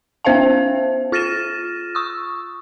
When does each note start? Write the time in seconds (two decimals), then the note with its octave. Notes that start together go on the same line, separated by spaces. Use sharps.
0.25 B3 C#4 C5 E5 F5 A5
1.12 F4 F6 A6 A#6 D#7 E7
1.95 C#6 D#6 E6